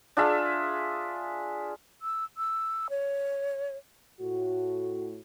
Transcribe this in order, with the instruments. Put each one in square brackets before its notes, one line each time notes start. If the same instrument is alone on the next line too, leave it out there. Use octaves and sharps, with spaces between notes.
[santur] D4 F4 G#4 E5
[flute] E6
E6
C#5
[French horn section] A2 F#4